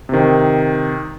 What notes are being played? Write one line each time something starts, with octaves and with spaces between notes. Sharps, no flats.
C3 D#3